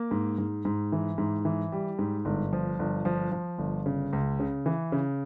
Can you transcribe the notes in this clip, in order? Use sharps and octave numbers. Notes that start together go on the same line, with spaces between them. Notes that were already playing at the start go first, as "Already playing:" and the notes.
Already playing: A#3
G#2
G#2
G#2
E3
G#2
E3
G3
G#2
G1
F3
G1
F3
F3
G1
C#3
C#2
C#3
E3
C#3